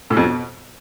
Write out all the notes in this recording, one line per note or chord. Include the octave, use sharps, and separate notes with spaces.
A2
F2
B2